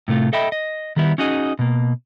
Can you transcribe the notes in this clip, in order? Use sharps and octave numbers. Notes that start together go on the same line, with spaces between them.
A2 C3 A3 F4
A4 D#5 E5 G5 B5
D#5
D#3 G3 B3 E4
C#4 D#4 F#4 G#4 D#5
B2 A#3